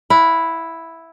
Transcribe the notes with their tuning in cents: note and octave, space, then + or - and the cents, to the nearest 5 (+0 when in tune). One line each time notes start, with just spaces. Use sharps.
E4 +0 F#5 -40